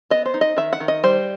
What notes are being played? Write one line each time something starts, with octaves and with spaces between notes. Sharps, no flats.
B3 D#5
C5
D#4
D#5
D#3 E5
F#5
D#3
D#5
G3 C5